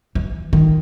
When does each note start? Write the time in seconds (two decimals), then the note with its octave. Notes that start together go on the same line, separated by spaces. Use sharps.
0.15 E3
0.53 D#3